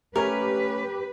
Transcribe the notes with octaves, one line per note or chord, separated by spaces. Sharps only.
A3 C#4 G4 A#4 B4 C#5